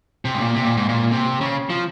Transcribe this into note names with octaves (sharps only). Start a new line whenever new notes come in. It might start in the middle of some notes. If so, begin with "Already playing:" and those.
C3
G#2
A#2
C3
A#2
G#2
A#2
C3
C#3
F3